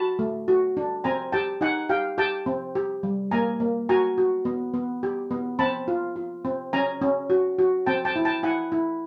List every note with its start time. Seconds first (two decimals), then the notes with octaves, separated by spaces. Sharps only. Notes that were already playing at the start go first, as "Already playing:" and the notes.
Already playing: F#4 A5 B5
0.19 A3
0.48 F#4
0.77 D4
1.04 C4 G#5 A#5
1.32 G4 G5 A5
1.61 D#4 F#5 G#5
1.89 G4 F5 G5
2.18 G4 G5 A5
2.46 C4
2.75 G4
3.03 G3
3.31 A#3 G#5 A#5
3.60 A#3
3.89 F#4 G#5 A#5
4.18 F#4
4.45 B3
4.74 B3
5.03 G4
5.31 B3
5.59 C4 A5 B5
5.88 F4
6.16 F4
6.45 C4
6.73 C#4 G#5 A#5
7.02 C#4
7.30 F#4
7.59 F#4
7.86 C4 G5 A5
8.05 G5 A5
8.16 E4
8.25 G5 A5
8.43 E4 F#5 G#5
8.72 E4